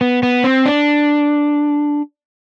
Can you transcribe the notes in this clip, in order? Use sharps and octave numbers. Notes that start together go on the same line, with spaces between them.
B3
B3
C4
D4